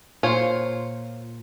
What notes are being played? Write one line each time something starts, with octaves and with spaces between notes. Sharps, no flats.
A#2 F4 C5 C#5